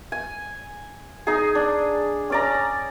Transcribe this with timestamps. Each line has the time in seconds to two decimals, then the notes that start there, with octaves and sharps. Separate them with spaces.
0.12 G#5
1.27 D#4 G#4
1.55 D4
2.30 C#4 D5 A#5